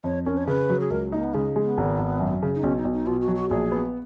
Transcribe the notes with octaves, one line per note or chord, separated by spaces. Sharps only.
F2 C#5
C#4 A#4
C#5
C#3 B4
F#3
G#4
C#2 A#4
A#3 D#4
B3
C#3 G#3
G#3
B3
G#1
G#1
F#2
C#3
D#4
B1 C#4
D#4
B1
D#4
B2 F4
F#4
F#3
F#4
A#1 G#4
B3